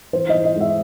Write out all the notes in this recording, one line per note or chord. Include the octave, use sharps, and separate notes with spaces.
E3 C5
E3 D#5
D#5
G#3
E5